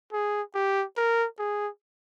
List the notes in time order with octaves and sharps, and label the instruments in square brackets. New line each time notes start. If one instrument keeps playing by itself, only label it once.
[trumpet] G#4
G4
A#4
G#4